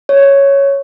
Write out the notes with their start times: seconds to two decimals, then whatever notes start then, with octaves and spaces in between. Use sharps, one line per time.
0.09 C#5